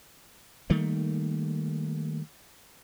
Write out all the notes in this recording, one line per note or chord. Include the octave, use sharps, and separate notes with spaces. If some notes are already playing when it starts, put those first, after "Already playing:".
D#3 G3 A3 A#3